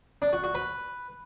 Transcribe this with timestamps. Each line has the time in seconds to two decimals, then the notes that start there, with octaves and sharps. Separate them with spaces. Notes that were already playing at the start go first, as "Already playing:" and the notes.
0.22 D4
0.33 F#4
0.44 F#4
0.55 B4